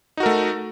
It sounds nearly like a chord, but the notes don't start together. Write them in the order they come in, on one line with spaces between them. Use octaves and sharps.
D#4 F#4 A#4 A3